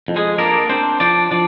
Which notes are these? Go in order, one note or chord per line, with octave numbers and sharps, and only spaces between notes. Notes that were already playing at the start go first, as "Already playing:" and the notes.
F2
G#3 G#4
A#3 D4 A#4
C4 D4 C5
F3 D4 D5
F3 D4 D5